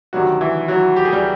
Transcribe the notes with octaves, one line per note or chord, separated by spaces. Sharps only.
D2 C3 D#3 F#3 G3 F#4
E3 E4
F#3 F#4
G4
G#4
G3 G4